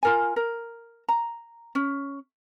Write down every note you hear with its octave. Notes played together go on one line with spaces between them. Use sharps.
F4 A#4 G#5
A#4
A#5
C#4